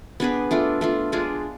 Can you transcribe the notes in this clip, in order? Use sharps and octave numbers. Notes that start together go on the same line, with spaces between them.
B3 D4 G#4 B4
A3 D4 F4
A3 D4 F4
G#3 D4 F4 G#4